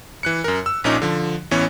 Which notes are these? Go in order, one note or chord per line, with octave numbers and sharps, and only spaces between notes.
E3 F#6 C#7
F#2 A#4
E6
A#1 A#2 C#4 D#4 D6
D3 F3
A1 E3 B3 C#4 C#5